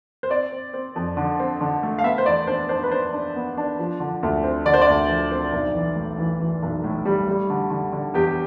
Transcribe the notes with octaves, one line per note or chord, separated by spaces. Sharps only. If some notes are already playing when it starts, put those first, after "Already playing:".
C5
C4 D5
C4
C4
F2
D3
C4
D3
A3
F5
B3 E5
C5
E2 D5
D4 C5
D4 C5
B4
D4 C5
D4
B3
D4
F3
D3
D2
C4
D3 D5
C5
D5
D2
F3
C4
B1
E3
A2
E3
E3
B1
A2
G3
G3
D3
D3
D3
E2 G4